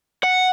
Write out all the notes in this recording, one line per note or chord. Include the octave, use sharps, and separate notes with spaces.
F#5